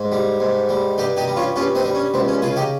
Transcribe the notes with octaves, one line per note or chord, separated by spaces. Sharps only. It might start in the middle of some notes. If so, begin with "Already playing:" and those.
Already playing: G#2
G3
G#2
G3
G2 D#4 G4
D#4 G4
G3
C#4 F4
G2 C#4 F4
C4 D#4
G3
C#4
C#2 C4
C#4
C#3 F4 G#4
D#4 G4